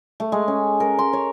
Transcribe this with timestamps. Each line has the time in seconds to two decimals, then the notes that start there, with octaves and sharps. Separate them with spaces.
0.20 A3
0.32 G#3
0.48 C#4
0.80 A#4
0.99 C6
1.13 C#5